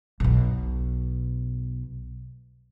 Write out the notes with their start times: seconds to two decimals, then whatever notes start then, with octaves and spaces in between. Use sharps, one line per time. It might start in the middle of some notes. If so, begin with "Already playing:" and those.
0.20 B1 B2